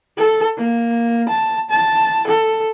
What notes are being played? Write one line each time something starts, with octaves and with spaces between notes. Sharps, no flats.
A4
A#3
A5
A5
A4